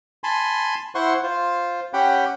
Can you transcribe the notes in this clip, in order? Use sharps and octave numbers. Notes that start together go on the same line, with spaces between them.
G#5 A5 B5 C6
E4 C5 F#5 C6 C#6
F4 C5
C#4 G4 F#5 G5 B5